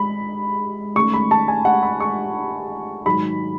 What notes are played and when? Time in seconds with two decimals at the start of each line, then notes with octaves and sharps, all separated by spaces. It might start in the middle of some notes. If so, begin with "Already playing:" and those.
Already playing: G#3 B5
0.95 D#3 A3 C#4 C#6
1.14 B5
1.31 A5
1.48 G#5
1.65 F#5
1.83 B5
2.00 C#6
3.05 G#2 D#3 F#3 B5